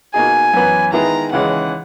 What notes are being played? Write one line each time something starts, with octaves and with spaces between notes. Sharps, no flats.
B2 A#3 D#4 G#4 G#5
F#2 E3 B3
D#3 G#3 B3 E4 G#4 A#5
D#2 C#3 E3 G#3 F#5